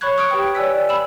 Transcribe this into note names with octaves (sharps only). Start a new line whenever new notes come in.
C#5 B5 C#6 F#6 G#6
C#6 D#6 F6 G#6 C#7 D7
G4 B4 G5
C#5 D5 G#5 E6 F#6 B6
B5 E6 E7